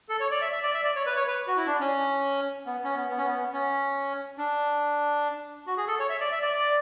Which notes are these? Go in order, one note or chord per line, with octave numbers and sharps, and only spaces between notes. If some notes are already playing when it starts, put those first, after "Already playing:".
A4
C#5
D5
E5
E5
D5
E5
D5
C#5
B4
C#5
B4
F#4
E4
D4
C#4
B3
C#4
B3
B3
C#4
B3
C#4
D4
F#4
G#4
A4
C#5
E5
D5
E5
D5
D5